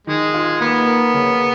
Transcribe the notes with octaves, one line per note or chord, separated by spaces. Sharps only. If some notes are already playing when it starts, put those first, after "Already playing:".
D#3 G#3
F4
A#3 B3
A#4
C#3